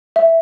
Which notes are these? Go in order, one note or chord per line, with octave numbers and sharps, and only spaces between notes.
E5